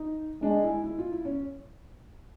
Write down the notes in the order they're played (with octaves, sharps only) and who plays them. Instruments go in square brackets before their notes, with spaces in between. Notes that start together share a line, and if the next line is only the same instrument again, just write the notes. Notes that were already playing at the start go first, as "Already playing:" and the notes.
Already playing: [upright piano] D#4
[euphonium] G#3 [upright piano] D4
[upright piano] E4
E4
F4
E4
C#4